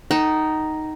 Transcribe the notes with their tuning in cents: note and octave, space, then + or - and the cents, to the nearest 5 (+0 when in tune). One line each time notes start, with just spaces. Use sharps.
D#4 +0 A4 +0 F#5 +45